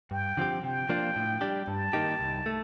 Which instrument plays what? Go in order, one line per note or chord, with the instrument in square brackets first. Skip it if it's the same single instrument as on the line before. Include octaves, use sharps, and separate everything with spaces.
[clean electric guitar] G2 [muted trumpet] G5
[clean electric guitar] D3 F3 C4 G4
[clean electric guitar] C3 [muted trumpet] G5
[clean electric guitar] F3 A#3 D4 F4
A2
G3 D4 G4
[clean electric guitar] G2 [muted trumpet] A5
[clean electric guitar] D#3 A#3 D#4 G4
C2
A3